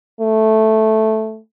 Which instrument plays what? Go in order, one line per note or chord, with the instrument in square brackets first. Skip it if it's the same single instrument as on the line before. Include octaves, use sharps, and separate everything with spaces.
[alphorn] A3